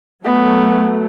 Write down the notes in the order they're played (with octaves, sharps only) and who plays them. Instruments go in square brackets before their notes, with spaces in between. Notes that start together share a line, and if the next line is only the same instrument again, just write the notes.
[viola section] F#3 A3 [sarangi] B3